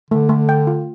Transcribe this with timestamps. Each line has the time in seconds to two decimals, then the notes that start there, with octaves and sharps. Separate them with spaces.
0.11 D3 A3
0.29 A3
0.49 G5
0.67 F4